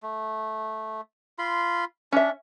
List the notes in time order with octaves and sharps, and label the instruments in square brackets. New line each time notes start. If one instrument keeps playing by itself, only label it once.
[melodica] A3
F4 B5 C6
[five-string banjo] C#4 E5 [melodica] D4